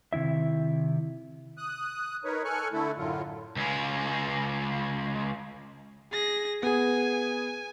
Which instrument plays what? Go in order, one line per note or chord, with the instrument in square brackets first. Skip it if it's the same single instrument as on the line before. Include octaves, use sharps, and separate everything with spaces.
[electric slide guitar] C3 D#3 E4 E5
[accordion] D#6 F#6
D#4 A#4 B4 C#5
A4 G#5 C#6 F6 F#6
D3 A3 E4 A4
F#2 A2 D3 F#3 F4
[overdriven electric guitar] C#2 G#3
[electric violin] G#4 A#6
[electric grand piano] B3 G#4 [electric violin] G#5